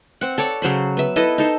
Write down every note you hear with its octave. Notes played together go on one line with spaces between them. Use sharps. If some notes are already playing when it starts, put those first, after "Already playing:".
C4 F#5
A4 C#5 D5
C#3 F#3 C5 B5
B3 E5
E4 A4 B4 D#5
D#4 A4 C5